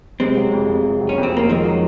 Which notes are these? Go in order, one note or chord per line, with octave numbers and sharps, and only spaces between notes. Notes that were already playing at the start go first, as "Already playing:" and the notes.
C3 G#3 C4
F#3
F2
F2
C3
F#3
C#4
F2
C4
F2 A#3
D#3 F3 G#3
F#3